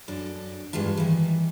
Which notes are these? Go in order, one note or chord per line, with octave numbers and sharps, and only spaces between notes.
F#2 D4 A4
G2 E3 G#3 F4 A5
D#3 E3